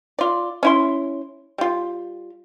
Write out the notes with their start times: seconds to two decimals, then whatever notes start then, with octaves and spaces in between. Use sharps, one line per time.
0.19 F4 D5
0.63 C#4 E4 C6
1.58 G3 F4